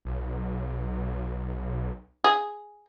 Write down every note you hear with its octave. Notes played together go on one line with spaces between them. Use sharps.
B1
G#4